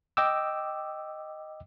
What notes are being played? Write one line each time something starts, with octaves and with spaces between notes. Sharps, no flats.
D#5 G5 D6 E6